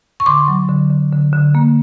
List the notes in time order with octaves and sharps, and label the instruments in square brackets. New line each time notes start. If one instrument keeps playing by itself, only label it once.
[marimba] C#6
D3 C6 D6
F#3
D3
D3
D3
D3
A#3